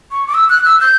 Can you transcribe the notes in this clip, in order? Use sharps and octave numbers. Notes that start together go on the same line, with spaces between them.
C#6
D6
E6
F#6
E6
G6